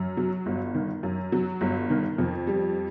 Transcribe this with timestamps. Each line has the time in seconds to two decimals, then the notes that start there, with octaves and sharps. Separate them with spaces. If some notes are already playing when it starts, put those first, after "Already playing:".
Already playing: F#2
0.17 F#3
0.46 G1
0.74 D#3
1.03 F#2
1.32 F#3
1.61 G1
1.90 D#3
2.18 F2
2.47 G3